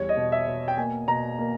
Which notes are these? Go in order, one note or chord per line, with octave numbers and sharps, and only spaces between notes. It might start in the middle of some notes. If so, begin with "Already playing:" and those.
Already playing: E2 G3 C#5
D#5
B2
E5
B2
G5
A#3 G#5
B2 A#5
A#3